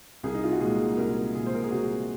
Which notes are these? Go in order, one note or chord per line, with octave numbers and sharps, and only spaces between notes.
C2 G#4
D#4
F4
F#4
A#2 G#3 G#4
C2 A#4
A#2 G#3 G#4
C5
A#4
G#4
C2 F#4